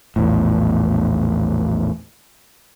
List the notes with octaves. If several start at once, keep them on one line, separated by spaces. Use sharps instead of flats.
A#1 E2 A2